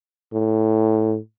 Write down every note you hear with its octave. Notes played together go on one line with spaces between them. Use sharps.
A2